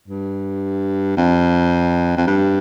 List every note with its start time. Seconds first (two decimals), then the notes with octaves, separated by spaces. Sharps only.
0.08 G2
1.17 F2
2.17 F2
2.27 G2